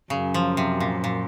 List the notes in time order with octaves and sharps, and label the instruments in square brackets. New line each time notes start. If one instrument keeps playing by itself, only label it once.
[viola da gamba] F#2 [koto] C#3
[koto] F3
C3
A#2
A#2